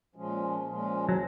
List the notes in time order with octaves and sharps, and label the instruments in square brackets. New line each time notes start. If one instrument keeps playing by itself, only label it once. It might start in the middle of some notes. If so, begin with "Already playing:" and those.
[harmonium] A#2 F3 G#3 C#4
A#2 F3 G#3 C#4
[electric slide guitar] F#3